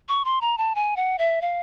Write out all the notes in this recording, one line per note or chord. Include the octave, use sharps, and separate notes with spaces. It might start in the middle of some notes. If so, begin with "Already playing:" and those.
C#6
C6
A#5
A5
G#5
F#5
E5
F5